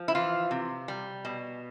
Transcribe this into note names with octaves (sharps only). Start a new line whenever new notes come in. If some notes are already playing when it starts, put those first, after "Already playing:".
Already playing: F3
E4
E3 F4
C3
G3
B2